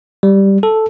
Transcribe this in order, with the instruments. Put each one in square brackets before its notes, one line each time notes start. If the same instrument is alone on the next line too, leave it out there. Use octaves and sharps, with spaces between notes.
[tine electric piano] G3
A4